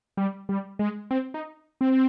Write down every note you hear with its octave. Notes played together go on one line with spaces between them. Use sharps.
G3
G3
G#3
C4
D#4
C4